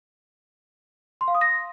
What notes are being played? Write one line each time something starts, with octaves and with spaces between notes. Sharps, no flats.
C6
F5
D#6
A#6